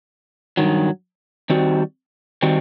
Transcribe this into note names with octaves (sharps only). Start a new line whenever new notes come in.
G2 D#3 F#3
D#3 G3 C4 F#4
D#3 G3 C4 F#4